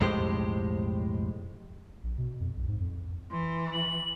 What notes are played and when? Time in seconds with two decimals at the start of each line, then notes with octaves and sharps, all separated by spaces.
0.01 B1 F2 A2 G#3 G4 C5
2.03 A#1
2.18 B2
2.40 F2
2.56 B1
2.68 G#2
2.80 F2
3.31 E3 C6
3.72 F#7